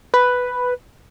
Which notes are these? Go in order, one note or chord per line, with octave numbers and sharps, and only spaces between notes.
B4